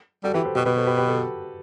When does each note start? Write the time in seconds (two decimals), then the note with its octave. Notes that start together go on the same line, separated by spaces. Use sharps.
0.24 G3 F#4 A4
0.34 E3 G4 B4
0.45 A4 C5
0.55 B2 G4 B4
0.66 B2 G4 B4
0.76 A4 C5
0.87 G4 B4
0.97 G4 B4
1.08 F#4 A4